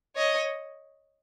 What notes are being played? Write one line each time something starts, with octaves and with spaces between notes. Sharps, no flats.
C#5 D#5